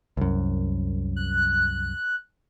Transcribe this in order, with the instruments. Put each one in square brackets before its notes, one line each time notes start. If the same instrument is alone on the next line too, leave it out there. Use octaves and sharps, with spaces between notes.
[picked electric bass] C2 F#2
[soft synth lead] F#6